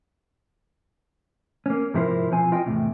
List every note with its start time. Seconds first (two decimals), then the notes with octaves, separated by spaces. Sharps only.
1.66 A#3 C#4
1.94 G#2 C3 F3 E4 A#4 C5
2.31 B1 F3 C4 G#5
2.52 F4 D#5 G5
2.66 E2 A2 C3